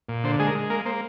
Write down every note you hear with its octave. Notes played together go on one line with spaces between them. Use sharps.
A#2
D3 C5
G#3 G#4
A#4
G#3
A#3 A#4
A#3 C5